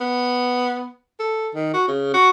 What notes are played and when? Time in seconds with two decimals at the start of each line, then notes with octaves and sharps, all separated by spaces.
0.01 B3
1.19 A4
1.54 D#3
1.74 F#4
1.88 C#3
2.14 F#4